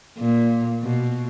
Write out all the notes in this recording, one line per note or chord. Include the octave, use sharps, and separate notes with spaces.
A#2
B2